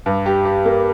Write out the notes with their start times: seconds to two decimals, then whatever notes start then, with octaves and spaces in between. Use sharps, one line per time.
0.06 G2
0.26 G4
0.45 G4
0.65 A#3